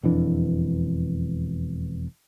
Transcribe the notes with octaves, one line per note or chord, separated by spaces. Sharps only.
E1 F2 E3 D4